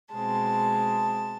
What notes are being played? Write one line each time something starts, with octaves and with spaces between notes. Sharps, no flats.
B2 G#3 C4 A5